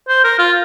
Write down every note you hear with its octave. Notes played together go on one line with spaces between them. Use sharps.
C5
A#4
F4